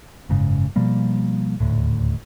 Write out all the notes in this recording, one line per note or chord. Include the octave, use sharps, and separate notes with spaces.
F#1 G#2 C#3
B2 F3 G3 A#3
D#1 D2 A2